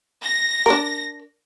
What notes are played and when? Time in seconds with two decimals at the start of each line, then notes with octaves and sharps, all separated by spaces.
0.23 A#6
0.66 D4 A#4